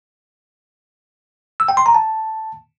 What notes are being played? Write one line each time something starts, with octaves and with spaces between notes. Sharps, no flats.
E6
G5
C6
A#5
A5